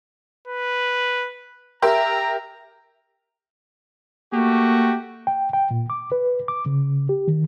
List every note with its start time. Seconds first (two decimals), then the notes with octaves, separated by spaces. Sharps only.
0.48 B4
1.82 G4 A#4 E5 A#5
4.33 A3 A#3 F#4 G4
5.27 G5
5.53 G5
5.71 A#2
5.90 D6
6.12 B4
6.48 D6
6.66 C#3
7.09 G4
7.28 D#3